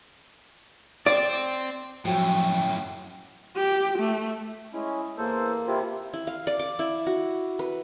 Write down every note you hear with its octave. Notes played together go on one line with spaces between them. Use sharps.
C4 D5
F#2 A2 F3 F#3 G5
G4
A3
G#3 C#4 E4
E2 A#3 A4 C5
C3 C4 E4 F4
E4
F5
D5
D6
E4
F#4
B4